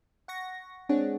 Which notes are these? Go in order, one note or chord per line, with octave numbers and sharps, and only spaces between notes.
F#5 C#6 A#6
G#3 C4 D4 G#4 C#5 F#5